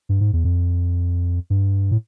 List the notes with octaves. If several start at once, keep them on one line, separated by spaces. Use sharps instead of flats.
G2
G#2
E2
F2
G2
A2